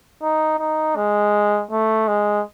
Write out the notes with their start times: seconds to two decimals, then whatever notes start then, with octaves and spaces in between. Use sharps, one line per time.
0.22 D#4
0.59 D#4
0.96 G#3
1.71 A3
2.08 G#3